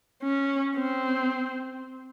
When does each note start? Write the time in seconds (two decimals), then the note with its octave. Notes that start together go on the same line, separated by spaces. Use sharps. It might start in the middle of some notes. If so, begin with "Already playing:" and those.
0.22 C#4
0.76 C4